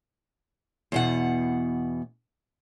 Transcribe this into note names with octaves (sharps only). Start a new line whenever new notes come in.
E2 B2 F#5